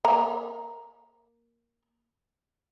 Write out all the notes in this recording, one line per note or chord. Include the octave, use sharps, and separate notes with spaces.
A#3 A#5